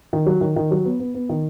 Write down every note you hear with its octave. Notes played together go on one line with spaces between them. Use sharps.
D#3
F#3
D#3
D#3
F#3
B3
B3
B3
D#3